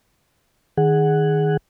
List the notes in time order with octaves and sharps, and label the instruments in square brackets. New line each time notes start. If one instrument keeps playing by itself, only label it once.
[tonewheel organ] D#3 G#4 F#5